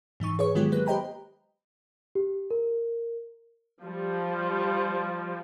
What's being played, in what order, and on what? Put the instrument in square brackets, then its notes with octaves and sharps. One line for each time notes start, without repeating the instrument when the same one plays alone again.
[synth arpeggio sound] G#2 E3 D#4 C#6
G#4 B4 C#5 C#6
D#3 F#3 G#3 B3 F4 G4
F#3 A#3 B4 F#6
G4 C5 D#5 G5 A#5 B5
[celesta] G4
A#4
[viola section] F3 G3